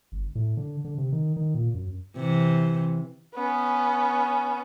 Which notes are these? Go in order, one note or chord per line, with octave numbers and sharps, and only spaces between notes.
G1
A2
D3
D3
C3
D#3
D#3
A#2
F#2
C3 E3
B3 C#4